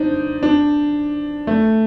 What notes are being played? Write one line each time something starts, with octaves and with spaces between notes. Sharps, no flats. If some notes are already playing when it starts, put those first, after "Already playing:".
Already playing: C4 D4 D#4
D4
A3